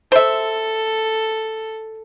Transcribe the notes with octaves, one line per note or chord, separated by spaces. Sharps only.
A4 C5 E5